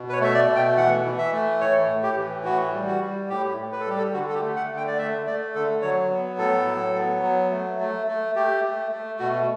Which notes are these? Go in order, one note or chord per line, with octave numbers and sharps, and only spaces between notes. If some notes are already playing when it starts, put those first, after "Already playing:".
Already playing: B2
B4
C#5
A3 E5
D5
B2
G5
E3 F#5
E3
E5
A3
A2 C#5
A2
G4
E3
A2 F#4
G3
F#4
G3
A2 G4
A2
B4
A4
G3 G4
A4
D3 F#4
A4
G4
A3
F#5
D3
G5
D5
A3 E5
A3 D5
D3 A4
F#3 C#5
B3
A2 A4
F#3
B3
F#3
A3
A3
A3
A3 G4
A3
A3
B2 F#4